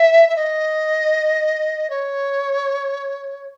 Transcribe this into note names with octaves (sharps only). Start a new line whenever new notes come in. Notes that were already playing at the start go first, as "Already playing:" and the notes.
Already playing: E5
E5
D#5
C#5